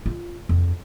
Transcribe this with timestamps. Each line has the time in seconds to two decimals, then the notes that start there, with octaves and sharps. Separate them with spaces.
0.06 F4
0.49 F2